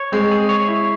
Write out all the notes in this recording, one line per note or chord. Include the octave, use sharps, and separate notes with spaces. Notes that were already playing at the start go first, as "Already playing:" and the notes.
Already playing: C#5
G#3 C4
G#4
C#5
E4